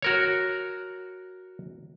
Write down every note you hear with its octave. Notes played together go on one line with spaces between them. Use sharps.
F#4 A#4 C#5